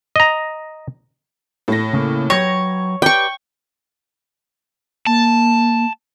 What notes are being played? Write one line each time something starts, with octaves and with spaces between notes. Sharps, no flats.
D#5 A#5
A2 A#6
C#3 A3 A#3
F#3 B4 C#5 G5 A#6
G4 B4 D5 G5 C#6
A#3 A5